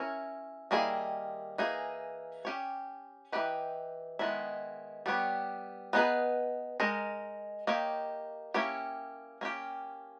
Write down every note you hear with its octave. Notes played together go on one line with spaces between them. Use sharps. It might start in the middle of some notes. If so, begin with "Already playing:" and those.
Already playing: C#4 E4 A#4 C#5
D#3 G3 A#3 E4 G#4
E3 A#3 D#4 G#4
C#4 G4 C#5
E3 A#3 D#4 G4 B4
D#3 G#3 B3 E4
G3 B3 G4 C#5
B3 D#4 G#4 B4
G#3 D#4 A#4
A#3 D#4 G4 C#5
A#3 C#4 E4 G4 C#5
A#3 C#4 G4